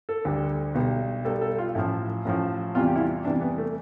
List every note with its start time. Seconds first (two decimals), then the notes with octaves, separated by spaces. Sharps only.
0.09 A4
0.25 D2 D3 G3
0.75 B1 B2 G3
1.25 B1 B2 G3 A4
1.41 A4
1.58 F4
1.75 A1 A2 F3 E4
2.25 A1 A2 F3
2.75 E2 C3 E3 G3 F4
2.87 G4
2.96 E4
3.00 F4
3.25 E2 C3 E3 G3 D4
3.41 B3
3.58 A3